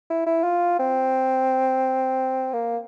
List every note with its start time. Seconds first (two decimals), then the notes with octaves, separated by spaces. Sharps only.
0.10 E4
0.26 E4
0.44 F4
0.79 C4
2.53 A#3